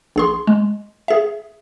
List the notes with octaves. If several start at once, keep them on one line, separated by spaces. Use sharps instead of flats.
A#1 G#4 C6
G#3
G#4 E5